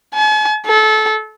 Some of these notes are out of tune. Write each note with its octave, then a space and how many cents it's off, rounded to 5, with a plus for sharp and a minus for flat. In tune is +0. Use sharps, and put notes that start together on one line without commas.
G#5 +45
A4 -25